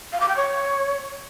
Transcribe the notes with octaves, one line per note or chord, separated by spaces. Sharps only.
F5
D6
G5
C#5